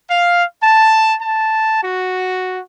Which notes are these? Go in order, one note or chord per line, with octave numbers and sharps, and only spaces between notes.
F5
A5
A5
F#4